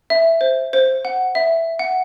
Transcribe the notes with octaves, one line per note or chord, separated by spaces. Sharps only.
E5
C5
C5
F#5
E5
F#5